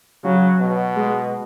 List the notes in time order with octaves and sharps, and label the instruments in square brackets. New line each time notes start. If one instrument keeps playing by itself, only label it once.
[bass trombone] C#3 [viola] F#3
[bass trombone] B2
[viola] G#3